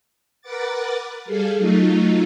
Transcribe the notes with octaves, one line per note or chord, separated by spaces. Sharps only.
A#4 B4 F#5 D6 A6
G3 G#4 A4 F5
F#3 A3 D#4 F4